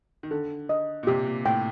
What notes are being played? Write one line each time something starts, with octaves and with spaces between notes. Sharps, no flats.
D#3
D3 A4
D#5
A#2
C3 G4
A#2
A2 G5